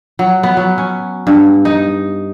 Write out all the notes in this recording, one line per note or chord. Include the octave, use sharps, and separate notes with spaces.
F#3
B3
F#3
C#4
G2
D#4